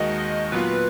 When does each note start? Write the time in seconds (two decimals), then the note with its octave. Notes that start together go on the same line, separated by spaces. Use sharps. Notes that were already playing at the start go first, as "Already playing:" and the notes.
Already playing: D#2 D#3 G#3 D#4 F#4 D#5
0.52 A#2 F#3 B3 F4 B4